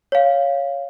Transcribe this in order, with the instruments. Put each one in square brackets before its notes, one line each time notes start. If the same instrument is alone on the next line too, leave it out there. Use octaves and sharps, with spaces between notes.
[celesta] C#5 F5